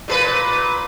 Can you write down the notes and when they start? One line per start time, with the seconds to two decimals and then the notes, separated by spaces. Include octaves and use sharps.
0.08 A#2 G#4 B4